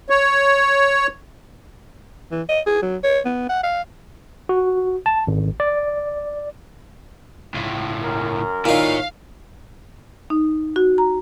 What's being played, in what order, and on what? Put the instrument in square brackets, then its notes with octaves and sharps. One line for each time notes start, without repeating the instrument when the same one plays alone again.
[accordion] C#5
[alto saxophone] E3
D#5
G#4
F#3
C#5
B3
F#5
F5
[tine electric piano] F#4
A5
G#1
D5
[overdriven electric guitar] C#2 A2
[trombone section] F#2 A#4
[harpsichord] A#2 D#3 [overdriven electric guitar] E4 C#5 [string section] F5
[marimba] D#4
F#4
A#5